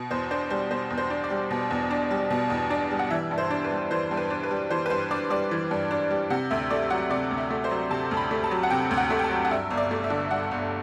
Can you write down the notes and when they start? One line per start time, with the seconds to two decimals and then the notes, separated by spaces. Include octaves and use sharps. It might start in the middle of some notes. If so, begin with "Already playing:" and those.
Already playing: B2
0.11 E2 C5
0.31 D4 C5
0.50 G3 C5
0.71 B2 C5
0.90 E2
0.98 C5
1.10 D4
1.24 D5
1.30 G3
1.51 B2
1.71 E2
1.91 D4
2.11 G3
2.31 B2
2.50 E2
2.70 D4
2.91 G3
2.99 F#5
3.11 E3 E5
3.31 G2
3.38 C5
3.50 D4
3.64 B4
3.71 G3
3.91 E3 C5
4.11 G2
4.17 B4
4.30 D4
4.43 B4
4.51 G3
4.70 E3 C5
4.86 B4
4.90 G2 C5
5.11 D4 D5
5.30 G3 D5
5.51 E3
5.71 G2
5.91 D4
6.11 G3
6.30 C3 F#5
6.51 D2 E5
6.71 A3 D5
6.90 F#3 F#5
7.11 C3 D5
7.31 D2
7.38 E5
7.51 A3
7.64 C5
7.71 F#3
7.91 C3 A5
8.11 D2
8.17 B5
8.31 A3
8.44 A5
8.51 F#3
8.63 F#5
8.70 C3 G5
8.91 D2
8.97 F#5
9.10 A3
9.19 G5
9.24 A5
9.31 F#3
9.45 F#5
9.51 G2 E5
9.71 G1
9.77 D5
9.91 A3
10.04 E5
10.10 D3
10.31 G2 F#5
10.51 G1